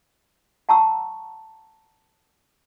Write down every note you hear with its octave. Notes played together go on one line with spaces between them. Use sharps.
F#5 A5 A#5 C#6 E6